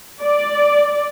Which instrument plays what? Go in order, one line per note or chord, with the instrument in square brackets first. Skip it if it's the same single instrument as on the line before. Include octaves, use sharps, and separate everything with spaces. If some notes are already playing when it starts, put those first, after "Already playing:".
[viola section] D5